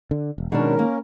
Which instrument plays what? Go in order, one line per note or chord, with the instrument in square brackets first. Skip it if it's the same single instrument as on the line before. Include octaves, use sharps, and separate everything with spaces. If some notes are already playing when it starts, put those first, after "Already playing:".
[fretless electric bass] D3
E1
[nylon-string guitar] B2 F#3 D4 [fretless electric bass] D#3 G#3 [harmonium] C#4 A#4
[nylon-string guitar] A#3